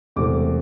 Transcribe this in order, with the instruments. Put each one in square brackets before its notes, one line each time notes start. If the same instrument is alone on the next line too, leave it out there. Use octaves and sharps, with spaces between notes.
[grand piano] E1 E2 C3 E3 A3 D6